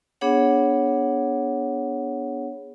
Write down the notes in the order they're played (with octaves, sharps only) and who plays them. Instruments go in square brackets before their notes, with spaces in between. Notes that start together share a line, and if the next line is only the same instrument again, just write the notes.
[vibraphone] B3 D4 G#4 C#5 F#5